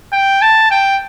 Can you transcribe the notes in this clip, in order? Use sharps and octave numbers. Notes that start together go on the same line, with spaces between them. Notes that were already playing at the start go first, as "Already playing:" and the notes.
G5
A5
G5